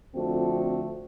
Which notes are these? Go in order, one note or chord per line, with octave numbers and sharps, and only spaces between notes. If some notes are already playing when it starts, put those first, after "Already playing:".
F2 D3 F3 A3 C4 F#4